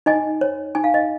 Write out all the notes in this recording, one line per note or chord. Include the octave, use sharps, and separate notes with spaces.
D#4 D#5 G#5
C#5
D#4 G#5
F5
D#5